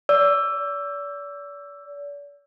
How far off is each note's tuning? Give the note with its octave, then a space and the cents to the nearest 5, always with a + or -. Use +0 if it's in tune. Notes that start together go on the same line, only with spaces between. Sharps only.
D5 -40 E6 +10